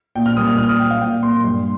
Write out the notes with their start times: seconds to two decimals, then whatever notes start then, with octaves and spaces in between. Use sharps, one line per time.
0.15 A#2 G5
0.26 F6
0.37 G3 A#3 D#6
0.47 F6
0.58 A#2 F6
0.69 D#6
0.80 A#3 G5
0.91 F5
1.01 A#2 G5
1.23 A#3 C6
1.44 G2